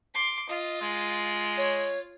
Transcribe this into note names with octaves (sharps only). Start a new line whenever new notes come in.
C6 D6
F4 D#5
G#3
C#5